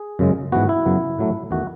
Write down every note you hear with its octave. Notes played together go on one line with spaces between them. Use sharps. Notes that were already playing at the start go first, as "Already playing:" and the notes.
Already playing: G#4
F#2 C#3 G#3
G#2 E3 B3 F#4
E4
F#2 C#3 F#3 B3
A2 F#3 A3
E2 D#3 A3 F#4